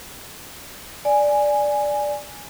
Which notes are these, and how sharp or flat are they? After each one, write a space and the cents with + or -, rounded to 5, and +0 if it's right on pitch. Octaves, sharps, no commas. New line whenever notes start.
D5 +0 G#5 +0